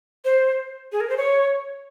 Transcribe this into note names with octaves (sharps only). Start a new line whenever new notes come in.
C5
G#4
A#4
C5
C#5